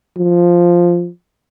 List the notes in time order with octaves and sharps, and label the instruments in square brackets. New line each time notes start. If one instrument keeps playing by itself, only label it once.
[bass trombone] F3